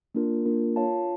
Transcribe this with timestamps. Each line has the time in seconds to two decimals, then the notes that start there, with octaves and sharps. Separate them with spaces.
0.15 A#3 D4 F4 A#4
0.46 A#3 D4 F4 A#4
0.76 F4 C#5 F5 A5